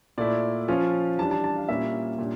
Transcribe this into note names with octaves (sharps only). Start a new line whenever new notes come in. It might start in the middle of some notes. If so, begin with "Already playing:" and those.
A#2 A3 E4 D5
F3 C#4 F4
E3 G3 D4 A5
A5
A5
F5
A#2 G3 A#3 C#4 E4 E5
A#2 G3 D4